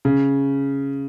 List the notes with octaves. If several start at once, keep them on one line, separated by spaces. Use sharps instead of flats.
C#3